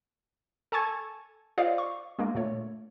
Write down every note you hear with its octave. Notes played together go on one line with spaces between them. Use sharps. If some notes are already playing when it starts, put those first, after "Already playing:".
A4 G#5 A5 C#6 G#6
F4 C5 D5 D#5 F5
C#6
G#3 A#3 D4
A#2 A3 C#5